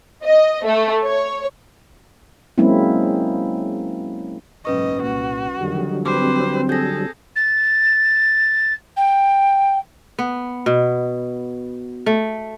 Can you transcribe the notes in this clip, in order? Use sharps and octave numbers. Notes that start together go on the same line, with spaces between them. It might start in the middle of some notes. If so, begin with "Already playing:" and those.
D#5
A3
C#5
F#3 G#3 A#3 C4 C#4 E4
F#1 B1 G#2 C#4 B4 D#5 C#6
C2 A#2 F#4
F2 D3 D#3 F#3 G3
C4 B4 C5 D6
G#4 A4 G6 A#6
A6
G5
B3
B2
A3